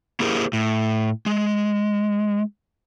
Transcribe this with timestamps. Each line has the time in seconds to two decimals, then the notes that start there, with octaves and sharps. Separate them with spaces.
0.20 A#3 E4 G4 G#4 A#4 C5
0.53 A2
1.26 G#3